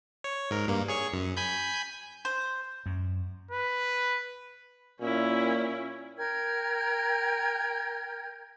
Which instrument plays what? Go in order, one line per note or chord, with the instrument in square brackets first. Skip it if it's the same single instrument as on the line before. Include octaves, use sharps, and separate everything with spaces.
[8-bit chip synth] C#5
G#2 A#4
G2 A#3
G#4 C#5 C#6
F#2
G#5 B5 G6
[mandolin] C5
[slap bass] F#2
[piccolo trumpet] B4
[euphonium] A#2 [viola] C#4 E4
[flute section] A#4 G5 F6 G#6